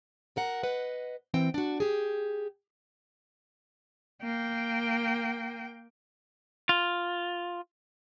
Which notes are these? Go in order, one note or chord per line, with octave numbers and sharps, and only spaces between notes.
F#4 A#4 F#5
B4 D#5 F#5
E3 C4 G5
D4 F#4
G4 G#4
A#3 G5
F4